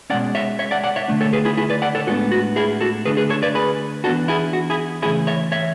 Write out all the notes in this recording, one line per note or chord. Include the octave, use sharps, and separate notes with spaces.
B2 G#3 C#4 D5 F#5
C#5 E5
C#5 E5
D5 F#5
D5 F#5
C#5 E5
D3 A3 D4
A4 C#5
G#4 B4
E4 G#4
E4 G#4
B4 D5
D5 F#5
A4 C#5
A2 G#3 B3 D4 F#4 A4
F#4
E4 G#4
F#4 A4
D3 A3 D4 G#4 B4
G#4 B4
A4 C#5
B4 D5
G#4 B4
E3 B3 D4 F#4 A4
E4 G#4
F#4
E4 G#4
C#3 E3 A3 C#4 E4 G#4
C#5 E5
C#5 E5